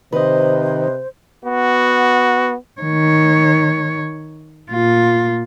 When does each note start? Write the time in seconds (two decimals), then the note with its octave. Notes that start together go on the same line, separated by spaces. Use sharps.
0.13 C3 D#3 B4 C5 D#5
1.45 B3 F#4
2.82 D#3 C#5
4.71 A#2 F4